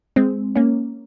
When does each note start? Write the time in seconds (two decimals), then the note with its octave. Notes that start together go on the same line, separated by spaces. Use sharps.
0.16 G#3 C4
0.56 A#3 C#4